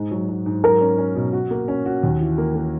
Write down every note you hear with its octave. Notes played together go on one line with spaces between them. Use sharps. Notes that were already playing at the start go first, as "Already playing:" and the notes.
Already playing: G#2 G#3
F#3
F#3
G#2
F#3 A#4
C#4
C#4
B2
F#4
A#3
C#4
F#4
D#2
E3
A#3
A#3